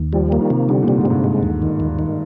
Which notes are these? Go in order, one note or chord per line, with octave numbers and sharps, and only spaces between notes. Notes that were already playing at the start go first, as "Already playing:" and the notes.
Already playing: D#2
F3 G3
A#3
D#3
C3
D3 G3
A#2
C3
G#2
G2 C3
G#3
D#2
D#3
D#2
D#3